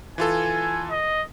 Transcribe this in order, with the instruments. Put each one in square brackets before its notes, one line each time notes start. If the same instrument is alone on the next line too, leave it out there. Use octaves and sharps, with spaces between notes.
[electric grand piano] E3 F4 A4 [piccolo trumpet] G#5
[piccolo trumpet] D#5